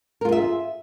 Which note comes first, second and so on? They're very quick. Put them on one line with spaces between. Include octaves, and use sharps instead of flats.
A#4 F4 G#4 E5